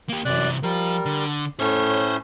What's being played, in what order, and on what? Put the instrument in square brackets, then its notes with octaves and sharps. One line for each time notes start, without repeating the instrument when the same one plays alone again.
[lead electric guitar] A#3 G4
[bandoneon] F#2 D5 F#6 [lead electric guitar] C3 E3
[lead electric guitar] F3 [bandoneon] G3 A#4
[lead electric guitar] D3
[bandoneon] A2 A3 C#4 [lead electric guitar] C5 C#5